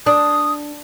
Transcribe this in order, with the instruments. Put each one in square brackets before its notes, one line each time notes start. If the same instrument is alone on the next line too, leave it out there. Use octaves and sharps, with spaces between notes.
[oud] D4 [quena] D#6